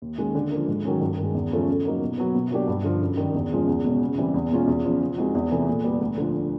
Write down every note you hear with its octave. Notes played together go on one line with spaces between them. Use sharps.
D#2
D#3 G#3 C#4
D3
F3 A#3
G#2
D#3 F#3 A3 C#4
G2
D#3
G#3
E2
C#3 F3 A3 C#4
C#3
F#3 A#3 D#4
B2
F#3 B3
B2
F#3 A#3 D4 G4
G2
D3 F3
F#2
D#3 G3
E2
C#3 F3 G#3
E2
B2 G#3 C#4
C#3
E3 G3 C4
E2
B2 G#3 C#4 F4
E2
C#3 F3
F3
G#3 C4 D#4 F#4
E2
C3 E3 A3
A#2
G3 B3
D2
D3 F3